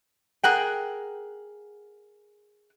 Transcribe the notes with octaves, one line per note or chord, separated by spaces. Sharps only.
G#4 A#4 F#5 G5